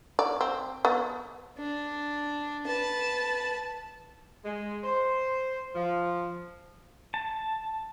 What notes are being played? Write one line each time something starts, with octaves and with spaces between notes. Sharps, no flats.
D5
C4
B3
D4
B4 A5
G#3
C5
F3
A5